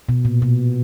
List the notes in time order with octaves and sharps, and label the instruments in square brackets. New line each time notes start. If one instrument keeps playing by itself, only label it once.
[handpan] B2
A#2
B2